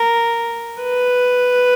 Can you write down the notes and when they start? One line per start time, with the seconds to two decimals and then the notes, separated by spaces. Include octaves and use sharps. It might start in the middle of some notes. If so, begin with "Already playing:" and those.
Already playing: A#4
0.83 B4